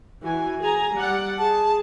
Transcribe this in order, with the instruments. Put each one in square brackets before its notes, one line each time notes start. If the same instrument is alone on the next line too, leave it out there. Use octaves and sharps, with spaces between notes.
[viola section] E3 F#4 G#5
G#4 G#5 A#5
G3 D5 F#5
[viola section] G#4 [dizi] A5